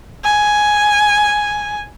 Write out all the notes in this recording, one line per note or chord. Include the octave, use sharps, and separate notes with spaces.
G#5